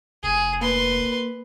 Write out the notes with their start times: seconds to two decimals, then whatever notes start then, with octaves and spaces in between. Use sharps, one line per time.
0.23 F1 G#4
0.61 A#3 B4 C6